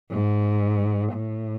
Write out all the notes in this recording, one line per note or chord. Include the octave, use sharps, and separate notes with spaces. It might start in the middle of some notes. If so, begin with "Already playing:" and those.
G#2
A2